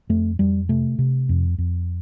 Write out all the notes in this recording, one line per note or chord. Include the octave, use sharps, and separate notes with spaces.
F2 A3
F2 G3
C3 A3
C3
F2
F2